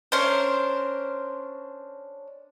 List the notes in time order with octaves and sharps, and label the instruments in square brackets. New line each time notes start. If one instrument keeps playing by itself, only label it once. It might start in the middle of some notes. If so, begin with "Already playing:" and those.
[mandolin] C#4 D4 A#4 C5